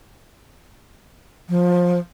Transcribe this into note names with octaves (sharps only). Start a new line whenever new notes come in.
F3